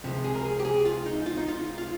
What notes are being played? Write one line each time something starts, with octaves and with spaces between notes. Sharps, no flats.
C#2 C3 F3
G#4
A#4
G#4
G4
G#4
F4
D#4
F4
D#4
F4
F4